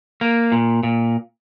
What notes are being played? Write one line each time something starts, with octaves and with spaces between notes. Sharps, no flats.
A#3
A#2
A#2